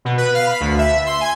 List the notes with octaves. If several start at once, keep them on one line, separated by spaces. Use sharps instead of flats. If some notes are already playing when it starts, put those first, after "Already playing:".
B2
B4
F5
B5
D2
E5
C6
G#5